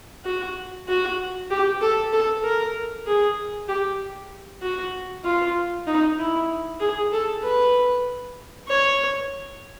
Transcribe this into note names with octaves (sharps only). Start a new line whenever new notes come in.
F#4
F#4
G4
A4
A4
A#4
G#4
G4
F#4
F4
D#4
E4
G#4
A4
B4
C#5